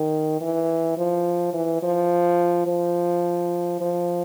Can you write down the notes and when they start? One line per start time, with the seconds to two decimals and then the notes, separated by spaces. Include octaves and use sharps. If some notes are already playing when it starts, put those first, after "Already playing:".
Already playing: D#3
0.41 E3
0.97 F3
1.54 E3
1.83 F3
2.67 F3
3.81 F3